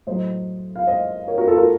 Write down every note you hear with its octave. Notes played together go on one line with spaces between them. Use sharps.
A2 F#3 C5 D#5
F5
C5 D#5
A#4 C#5
F#4 A#4
F4 A4
F#4 A#4